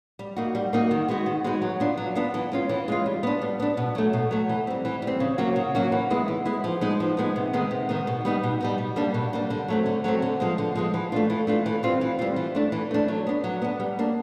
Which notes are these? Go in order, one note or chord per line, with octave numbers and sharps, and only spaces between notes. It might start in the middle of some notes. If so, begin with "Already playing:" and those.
G3
A#3 D#4 F#4
G3
A#3 D#4 F#4
D#3
G#3 B3 D#4 F#4
D#3
G#3 B3 D#4 F#4
F#3
B3 D4 F4
F#3
B3 D4 F4
E3
G#3 C#4 F4
E3
G#3 C#4 F4
G3
B3 D4
G3
B3 D4
B2
F#3 A3
B2
F#3 A3
E3
G3 C4
E3
G3
C4
C#3
F#3 A#3 C#4 F#4
C#3
F#3 A#3 C#4 F#4
E3
G#3 B3 E4
E3
G#3 B3 E4
F3
G#3 B3 D#4
F3
G#3 B3 D#4
C3
D#3 G#3 B3
C3
D#3 G#3 B3
B2
G3 B3 D#4
B2
G3 B3 D#4
B2
G3 A#3 D4
B2
G3 A#3 D4
D3
F#3 A3 C4
D3
F#3 A3 C4
D3
F3 G#3 B3
D3
F3 G#3 B3
E3
A3 D4 F4
E3
A3 D4 F4
E3
G3 C4 F4
E3
G3 C4 F4
E3
A3 D4
E3
A3 D4
F#3
B3 D4
F#3
B3 D4
G3
A#3 D4